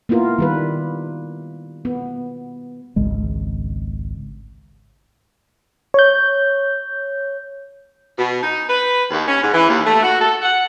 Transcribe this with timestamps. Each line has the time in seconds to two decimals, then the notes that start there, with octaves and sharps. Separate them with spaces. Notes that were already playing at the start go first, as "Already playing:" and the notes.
0.09 A#3 B3 E4 F4 A#4
0.38 D#3 G3 B4
1.85 B3
2.96 G#1 C#2 G#3
5.94 C#5 G6
8.19 B2
8.42 D#4
8.68 B4
9.10 D#2
9.27 C#4
9.42 G#2
9.54 E3
9.69 D#2
9.85 A3
10.03 F#4
10.19 A4
10.42 F#5